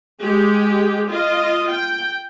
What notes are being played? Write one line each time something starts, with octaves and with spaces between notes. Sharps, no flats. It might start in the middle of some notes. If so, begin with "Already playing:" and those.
G#3 G4 G#4
F4 D#5
G5